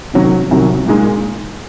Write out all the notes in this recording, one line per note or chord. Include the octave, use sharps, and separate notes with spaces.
C3 D#3 F#3 C#4
C2 C3 D#3 F#3
A#2 G#3 D#4